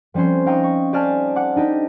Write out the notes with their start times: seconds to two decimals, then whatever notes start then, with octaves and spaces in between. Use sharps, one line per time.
0.14 F3 G3 C4 C#4 C5
0.46 D#4 F5 G5 A#5 C#6 D#6
0.63 C#6
0.93 G4 C5 D5 G#5 A5 F6
1.36 F#5 D6
1.56 D4 D#4 G4